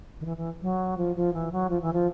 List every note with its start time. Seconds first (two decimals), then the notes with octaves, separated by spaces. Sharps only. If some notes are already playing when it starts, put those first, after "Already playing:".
0.20 D#3
0.25 E3
0.37 E3
0.62 F#3
0.98 F3
1.16 F3
1.34 E3
1.52 F#3
1.70 F3
1.82 E3
1.93 F3